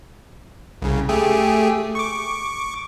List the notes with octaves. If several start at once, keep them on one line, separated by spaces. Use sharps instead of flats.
C2 C#3
A3 G4 G#4
C#6 D6